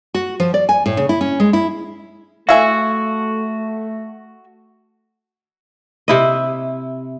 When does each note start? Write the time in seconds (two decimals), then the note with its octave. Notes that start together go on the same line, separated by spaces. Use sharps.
0.14 F#4
0.40 F3
0.54 D5
0.69 G#5
0.86 A2
0.97 C#3
1.09 E4
1.21 C#4
1.40 G#3
1.53 E4
2.49 A3 E4 F#4 E5 F5 G#5
6.08 C3 E4 D#5